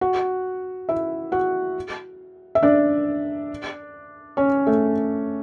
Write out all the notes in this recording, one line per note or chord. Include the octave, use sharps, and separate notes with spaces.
F#4 F#5
E4 E5
F#4 F#5
E5
D4 D5
C#4 C#5
A3 A4